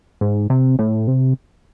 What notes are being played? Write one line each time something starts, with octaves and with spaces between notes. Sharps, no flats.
G#2
C3
A2
C3